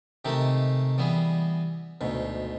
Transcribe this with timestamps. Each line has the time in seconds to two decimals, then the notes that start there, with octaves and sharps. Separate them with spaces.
0.25 C3 D#3 G#3 A3 G4
0.98 E3 G3 B3 G#4
2.01 D2 G#2 B2